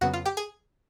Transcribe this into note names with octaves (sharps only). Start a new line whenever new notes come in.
F2 C#3 F#3 B3 F#4 F#5
F4 F5
G4 G5
G#4 G#5